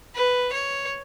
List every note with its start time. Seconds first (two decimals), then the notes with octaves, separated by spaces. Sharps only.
0.15 B4
0.53 C#5